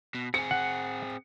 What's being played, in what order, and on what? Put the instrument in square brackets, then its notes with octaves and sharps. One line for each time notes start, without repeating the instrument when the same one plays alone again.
[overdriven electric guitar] B2
[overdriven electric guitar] C4 G#4 [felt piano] C#7
[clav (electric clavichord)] F#5